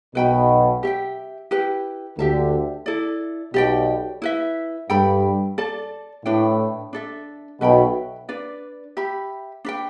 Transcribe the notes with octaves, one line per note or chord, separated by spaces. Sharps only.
B1 B2 B4 G5 B5
G4 E5 G5
E4 G4 B4 G5
D2 D3 G4 E5 A5
E4 A4 D5
B1 B2 G4 D5 G5
E4 B4 E5
G2 A4 G5 B5
A4 D5 A5
A2 D4 B4 G5
D4 A4 E5
B1 B2 B4 E5 G5 B5
D4 B4 D5
G4 E5 B5
D4 B4 G5